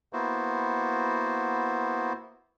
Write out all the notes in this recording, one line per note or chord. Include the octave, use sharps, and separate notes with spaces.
A#3 B3 E4 F#4 C5